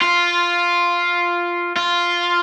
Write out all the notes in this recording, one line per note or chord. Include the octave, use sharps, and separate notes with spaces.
F4
F4